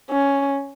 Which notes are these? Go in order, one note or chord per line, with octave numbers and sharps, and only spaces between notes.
C#4